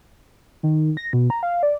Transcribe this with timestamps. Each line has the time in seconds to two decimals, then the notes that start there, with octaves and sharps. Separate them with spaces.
0.63 D#3
0.97 A#6
1.13 B2
1.30 A#5
1.43 F5
1.63 D5